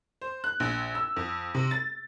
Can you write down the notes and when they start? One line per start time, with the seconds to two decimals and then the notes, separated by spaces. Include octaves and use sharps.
0.21 C5
0.44 F#6
0.60 A#1
0.95 E6
1.16 F2
1.54 C3
1.71 A6